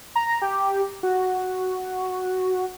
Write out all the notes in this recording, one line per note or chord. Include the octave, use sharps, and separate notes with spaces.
A#5
G4
F#4